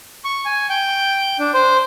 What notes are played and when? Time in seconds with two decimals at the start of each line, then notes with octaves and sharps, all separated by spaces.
0.24 C#6
0.45 G#5
0.70 G5
1.39 D4
1.54 C5